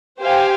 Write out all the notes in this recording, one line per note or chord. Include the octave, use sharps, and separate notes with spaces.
G4 C5 F5 G#5